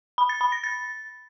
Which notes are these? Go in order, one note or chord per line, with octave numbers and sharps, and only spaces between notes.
B5
A6
B5
A#6
A6